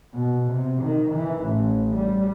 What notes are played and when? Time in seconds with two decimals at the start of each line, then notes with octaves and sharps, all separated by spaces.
0.12 B2
0.51 C3
0.82 D#3
1.14 E3
1.45 A1
1.96 G3